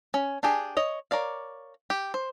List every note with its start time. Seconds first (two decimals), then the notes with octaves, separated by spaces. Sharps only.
0.14 C#4
0.43 D4 G4 G#4 G#5
0.77 C#5 D#5
1.11 A#4 C#5 D5 F5
1.90 G4
2.14 C5